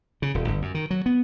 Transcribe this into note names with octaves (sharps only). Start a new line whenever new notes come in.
C#3
D#1
G1
F#2
D#3
F#3
B3